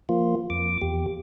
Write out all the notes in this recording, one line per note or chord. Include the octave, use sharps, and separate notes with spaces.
F3 A#3 F4
F2 D6
E2 G4